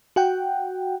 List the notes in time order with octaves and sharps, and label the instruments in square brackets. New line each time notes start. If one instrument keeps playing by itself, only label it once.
[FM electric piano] F#4 F#5 G5